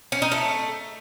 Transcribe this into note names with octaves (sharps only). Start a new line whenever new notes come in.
C#4
D#4
A3